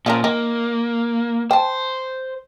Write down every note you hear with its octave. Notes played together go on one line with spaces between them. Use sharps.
A#2 F3 C#4 A#4
A#3 D#4
C5 G5 A5